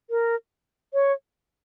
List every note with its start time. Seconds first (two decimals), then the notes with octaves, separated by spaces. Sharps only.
0.10 A#4
0.94 C#5